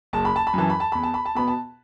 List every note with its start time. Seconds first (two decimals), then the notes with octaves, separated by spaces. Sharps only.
0.13 F#1 A5
0.25 B5
0.36 A5
0.47 B5
0.54 F#2 E3 A5
0.70 B5
0.80 A5
0.92 E2 B5
1.03 A5
1.14 B5
1.25 A5
1.35 B2 B3 B5
1.48 A5